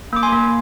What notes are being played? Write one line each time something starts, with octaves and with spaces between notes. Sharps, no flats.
A#3 D6
G#5 C6
A#3